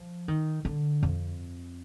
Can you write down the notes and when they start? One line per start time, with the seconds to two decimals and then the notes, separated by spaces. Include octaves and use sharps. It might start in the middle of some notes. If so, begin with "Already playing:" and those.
Already playing: F3
0.28 D#3
0.65 D3
1.03 F2